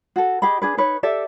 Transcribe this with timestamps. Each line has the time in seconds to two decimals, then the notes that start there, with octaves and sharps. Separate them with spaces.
0.16 F#4 A4
0.42 G4 G#4 D#5 B5
0.62 D4 G#4 B4
0.77 D#4 B4 C#5
1.03 G4 A4 D5 E5